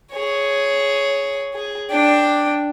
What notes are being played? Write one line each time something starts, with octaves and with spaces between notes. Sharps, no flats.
G#4 C#5
G#4
D4 G5